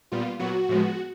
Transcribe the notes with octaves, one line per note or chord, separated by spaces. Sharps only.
A#2 G3 B3 F4
A#2 F#3 B3 F#4
A2 F3 G#3 B3